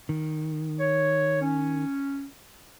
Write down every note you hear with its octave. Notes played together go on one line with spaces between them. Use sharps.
D#3
C#5
C#4